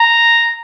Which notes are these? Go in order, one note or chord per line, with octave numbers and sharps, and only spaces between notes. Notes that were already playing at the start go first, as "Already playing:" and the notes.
Already playing: A#5